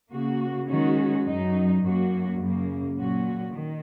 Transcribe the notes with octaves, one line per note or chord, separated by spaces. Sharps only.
C#3 A#3 F#4
D#3 G#3 C#4 F#4
F#2 F#3 D#4
F#2 F#3 A#3 F#4
F#2 C#3 A#3
A#2 F#3 C#4 F#4
D#3